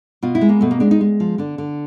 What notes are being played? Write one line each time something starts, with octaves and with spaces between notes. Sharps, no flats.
B2 F4
E4
G#3
A#3
B2 A3
A#3
G#3 D4
D#4
G#3
F3
D3 D4
D3